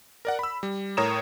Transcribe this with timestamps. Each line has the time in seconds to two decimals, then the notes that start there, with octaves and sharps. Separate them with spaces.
0.25 A#4 D5 F#5
0.39 B5 E6
0.63 G3
0.97 A2 A#4 C#5 A#5 D#6 E7